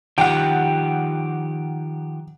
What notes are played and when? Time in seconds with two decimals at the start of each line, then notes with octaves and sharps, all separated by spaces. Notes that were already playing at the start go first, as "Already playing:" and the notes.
0.18 D#3 F3 G4 F#5 G5